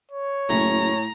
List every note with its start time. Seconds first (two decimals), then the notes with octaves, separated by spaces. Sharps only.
0.12 C#5
0.49 F#1 A2 G#5 A#5 B5